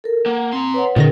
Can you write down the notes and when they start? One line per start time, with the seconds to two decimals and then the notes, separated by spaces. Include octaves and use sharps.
0.04 A4 A#4
0.26 A#3 F#5
0.53 C4 A#5 C6
0.74 B4 C#5 F#5
0.96 A#2 D3 D#3 C#4 G#4 A#4 A#6